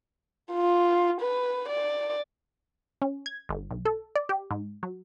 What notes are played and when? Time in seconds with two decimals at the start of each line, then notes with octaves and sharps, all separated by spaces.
0.53 F4
1.21 B4
1.69 D5
3.02 C#4
3.26 G#6
3.49 G1
3.71 B1
3.85 A4
4.16 D5
4.29 G4
4.51 G#2
4.83 F#3